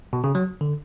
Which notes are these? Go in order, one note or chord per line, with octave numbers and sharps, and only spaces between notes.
B2
C#3
F#3
D3